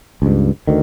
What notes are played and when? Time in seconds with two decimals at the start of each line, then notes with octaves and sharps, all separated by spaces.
0.22 C#2 G2
0.67 D2 D#3